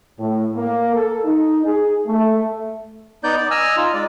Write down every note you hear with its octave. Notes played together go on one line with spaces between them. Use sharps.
A2
A#3
A4
D#4
G#4
A3
B3 D#4 D5 G6
D5
D#5 G#5 E6 F6
D#4 F4
G#3 D5